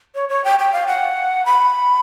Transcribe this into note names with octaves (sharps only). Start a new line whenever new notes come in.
C#5
C#5
G5
G5
F5
F#5
B5